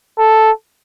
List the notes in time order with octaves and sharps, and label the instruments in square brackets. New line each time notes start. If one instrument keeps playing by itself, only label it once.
[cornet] A4